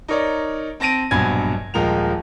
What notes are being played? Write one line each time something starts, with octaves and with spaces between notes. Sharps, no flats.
D#4 A#4 C#5 D5
C4 A5 A#6 D7 D#7
A#1 G2 B2 F#3 G#5 G#6
D#1 F3 G#3 A#4 G5 F7